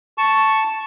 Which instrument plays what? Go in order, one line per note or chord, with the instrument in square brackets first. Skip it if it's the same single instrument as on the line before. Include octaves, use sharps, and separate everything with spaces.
[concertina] A5 C#6